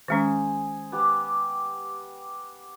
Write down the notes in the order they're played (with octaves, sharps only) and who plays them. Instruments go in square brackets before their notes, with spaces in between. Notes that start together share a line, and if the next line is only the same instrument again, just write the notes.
[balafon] D#3 G#3 C#4 [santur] G#4 C5
[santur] B3 G4 D6